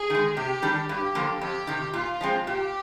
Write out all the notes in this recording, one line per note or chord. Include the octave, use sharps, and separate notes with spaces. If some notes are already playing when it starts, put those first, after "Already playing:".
Already playing: G#4
D#3 G#3
C3 G4
D#3 G3 D4
G2 G4
D3 F3 A#3
F2 G4
C3 D#3
A#2 F4
F3 G#3 C4
A#2 G4